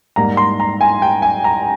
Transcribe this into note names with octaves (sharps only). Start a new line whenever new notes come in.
G#2 G3 A#3 A#5
C6
A#5
G#5
G5
G#5
A#5